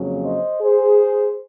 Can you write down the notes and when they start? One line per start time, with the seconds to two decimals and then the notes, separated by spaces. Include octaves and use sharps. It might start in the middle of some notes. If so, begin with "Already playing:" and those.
Already playing: F2 C#3 F#3 A#3 C#4
0.23 C5 D#5
0.61 G#4 C5